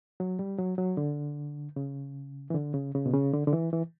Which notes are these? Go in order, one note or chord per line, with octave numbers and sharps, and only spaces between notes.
F#3
G3
F#3
F#3
D3
C#3
E3
D3
C#3
C#3
B2
C#3
D3
D3
E3
E3